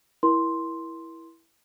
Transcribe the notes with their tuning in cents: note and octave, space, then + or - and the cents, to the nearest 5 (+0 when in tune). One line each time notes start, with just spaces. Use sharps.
E4 +0 A#4 +25 C6 +0